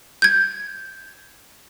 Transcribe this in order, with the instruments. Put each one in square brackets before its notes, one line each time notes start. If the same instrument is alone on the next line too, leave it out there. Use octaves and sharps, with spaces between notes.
[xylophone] G6 G#6